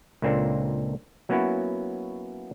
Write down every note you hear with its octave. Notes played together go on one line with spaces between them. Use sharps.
C#2 A#2 A#3 C4 D4 A4
F#3 A#3 B3 C#4 E4 F#4